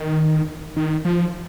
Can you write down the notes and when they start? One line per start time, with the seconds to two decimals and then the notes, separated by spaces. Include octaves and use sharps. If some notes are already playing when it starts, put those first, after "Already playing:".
Already playing: D#3
0.76 D#3
1.05 F3